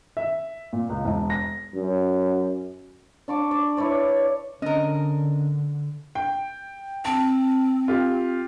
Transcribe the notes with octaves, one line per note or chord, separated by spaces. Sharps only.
E5
A#2
C#2
E1
A#6
F#2
D4 C#6 D6
D5
E4 B4 C#5 D5
D3 C#4 D4 A#4 D#5
G5
C4 A5
F4 G4